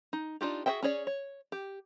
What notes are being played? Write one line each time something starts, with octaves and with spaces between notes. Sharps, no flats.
D#4
D4 D#4 F4 G4
F#4 G#4 C5 E5 G5
C#4 G#4 C#5 D5
C#5
G4